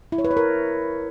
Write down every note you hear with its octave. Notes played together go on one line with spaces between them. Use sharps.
E4
C#5
B4
C#5
A#4